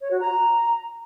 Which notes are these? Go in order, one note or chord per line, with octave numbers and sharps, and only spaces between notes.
C#5
F#4
A#5